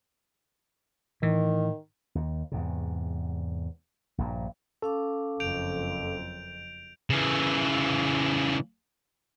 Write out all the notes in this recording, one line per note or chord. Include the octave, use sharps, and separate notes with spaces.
A2 D#3 E3
D#2
E2 G#2 C3
A#1 G2 A#2
C#4 A4 F5 D6
F#1 F2 G6 D7 F7
C#3 E3